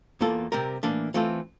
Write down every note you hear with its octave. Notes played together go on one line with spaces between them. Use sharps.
E2 E3 A#3 F4 A4
C3 G3 C4 G4 A#4
A2 E3 A#3 D4
E3 A3 C4 F4 A4